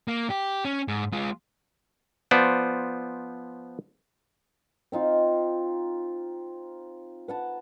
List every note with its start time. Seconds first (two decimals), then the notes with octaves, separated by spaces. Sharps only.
0.08 A#3
0.30 G4
0.65 C#4
0.88 G#2
1.12 G#3 F4
2.31 F3 B3 C5 D5
4.92 C4 D#4 F4
7.28 B4 F#5 A5